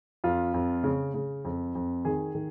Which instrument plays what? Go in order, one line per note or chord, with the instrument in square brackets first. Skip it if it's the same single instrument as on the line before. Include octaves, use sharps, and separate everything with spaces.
[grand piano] F2 F4
F2
C#3
C#3
F2
F2
D#3 G#4
D#3